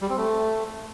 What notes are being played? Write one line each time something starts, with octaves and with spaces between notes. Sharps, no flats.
G3
C4
A3